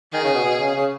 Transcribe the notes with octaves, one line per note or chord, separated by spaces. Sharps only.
D#3 G#4
C#3
B2
B2
C#3
C#3